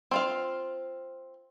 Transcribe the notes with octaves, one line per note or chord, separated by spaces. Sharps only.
C4 F4 F5